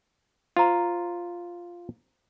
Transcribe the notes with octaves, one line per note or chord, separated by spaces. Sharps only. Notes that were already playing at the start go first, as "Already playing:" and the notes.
F4 C5 A#5